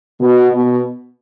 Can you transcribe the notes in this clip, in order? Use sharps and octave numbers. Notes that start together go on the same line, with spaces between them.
B2
B2